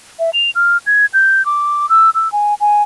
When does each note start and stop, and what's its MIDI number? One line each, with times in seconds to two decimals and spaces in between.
0.19 0.30 76
0.33 0.50 101
0.55 0.77 89
0.86 1.06 92
1.14 1.45 91
1.46 1.89 86
1.89 2.10 88
2.15 2.31 88
2.32 2.54 80
2.60 2.83 80